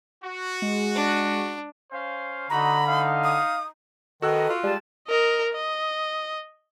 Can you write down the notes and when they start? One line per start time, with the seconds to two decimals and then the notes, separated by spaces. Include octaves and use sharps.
0.24 F#4
0.62 G#3
0.95 D4
1.92 C#4 C5 F5
2.50 D3 D#4 F#4 D#5 A#5 B5
2.87 D#4 F5
3.24 D#6
4.22 D#3 F#4 A4 B4 D#5 A#5 E6 F#6
4.49 F4
4.63 G3 G#3 G4 A5
5.07 A#4 D#5
5.52 D#5